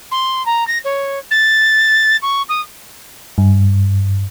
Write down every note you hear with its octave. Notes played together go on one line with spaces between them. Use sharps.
C6
A#5
A#6
C#5
A6
C#6
D#6
G2